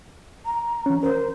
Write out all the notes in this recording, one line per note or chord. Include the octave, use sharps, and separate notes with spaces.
A#5
E3 C#4
A#4 C5